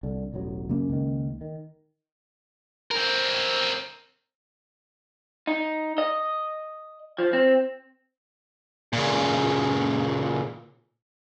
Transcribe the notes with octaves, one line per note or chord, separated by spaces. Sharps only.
C2 D3
E1 A1 F#3
F#2 C#3 A#3 C#4
C#2 D#3
D#3
C4 A#4
D#4
D#5
F3
C4
A#2 C#3